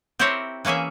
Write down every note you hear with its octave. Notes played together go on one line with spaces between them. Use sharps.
C4 E4 G4 A#4 C5 C#5
E3 A#3 C#4 G#4 E5